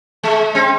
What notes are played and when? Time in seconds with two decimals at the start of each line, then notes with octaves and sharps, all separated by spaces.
0.23 G#3
0.55 C4